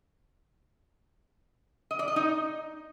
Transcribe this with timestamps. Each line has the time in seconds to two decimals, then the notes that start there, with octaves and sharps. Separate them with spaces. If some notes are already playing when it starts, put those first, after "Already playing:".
1.91 D#5
1.99 D5
2.08 D#5
2.16 D#4